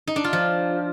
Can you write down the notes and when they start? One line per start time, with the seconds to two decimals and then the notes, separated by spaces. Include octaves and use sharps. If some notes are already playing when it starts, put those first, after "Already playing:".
0.07 D#4
0.16 D4
0.24 F4
0.33 F3